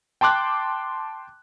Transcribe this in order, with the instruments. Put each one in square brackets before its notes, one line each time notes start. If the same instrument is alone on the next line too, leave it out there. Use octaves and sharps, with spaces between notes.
[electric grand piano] G5 A5 C6 D6 F#6